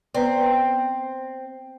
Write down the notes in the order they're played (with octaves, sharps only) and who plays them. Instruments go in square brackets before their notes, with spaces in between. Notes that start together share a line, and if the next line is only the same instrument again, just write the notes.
[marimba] B3 B4 D5 [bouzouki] C4